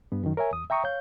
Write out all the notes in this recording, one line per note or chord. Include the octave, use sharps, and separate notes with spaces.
G2 B3
F#2 D#3
A#4 C#5 E5 G#5
E2 D#6
E5 G5 A#5 C#6 D#6
C#5 F5 G6